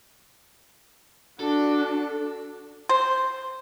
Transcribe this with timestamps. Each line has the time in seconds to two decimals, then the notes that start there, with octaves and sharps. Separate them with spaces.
1.40 D4 F#4 A4
2.89 C5